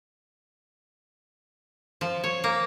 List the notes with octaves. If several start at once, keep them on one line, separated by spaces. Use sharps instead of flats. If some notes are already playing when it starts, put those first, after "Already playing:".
F3
C#5
A#3